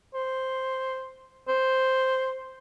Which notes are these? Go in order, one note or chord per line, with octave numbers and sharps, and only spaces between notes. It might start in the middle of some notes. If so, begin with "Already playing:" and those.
C5
C5